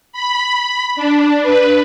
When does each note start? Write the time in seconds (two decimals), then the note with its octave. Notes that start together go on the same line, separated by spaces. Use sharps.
0.12 B5
0.96 D4
1.43 B4